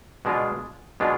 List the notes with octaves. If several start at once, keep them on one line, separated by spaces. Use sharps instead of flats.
B2 G#3 D4 F4
B2 G#3 D4 F4